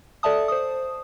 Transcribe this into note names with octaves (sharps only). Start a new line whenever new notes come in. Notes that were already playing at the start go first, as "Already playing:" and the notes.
A4 D5 E5 A5 D#6
C5 D#6